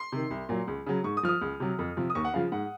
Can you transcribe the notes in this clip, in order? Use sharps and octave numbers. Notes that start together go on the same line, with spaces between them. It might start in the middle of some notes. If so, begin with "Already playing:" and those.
Already playing: C6
C3 D#3
C2
A#2 F#3
C#2
C#3 F#3
G#2 C#6
D#6
F3 F6
D#6
C#2
C3 F#3
F2
C3 F3
D#6
D#2 C#6
F#5
C#3 F3 F5
G#2 F#5